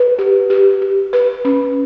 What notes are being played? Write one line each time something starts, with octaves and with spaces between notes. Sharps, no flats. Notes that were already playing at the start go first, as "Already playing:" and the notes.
Already playing: B4
G4
G4
G4
B4
C#4